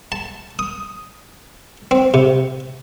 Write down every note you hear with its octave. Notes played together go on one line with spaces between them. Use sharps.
A5
D#6
C4
C3